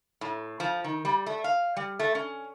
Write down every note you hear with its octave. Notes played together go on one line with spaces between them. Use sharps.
A2
F3
D#3
G3
A3
F5
G3
A3
C#4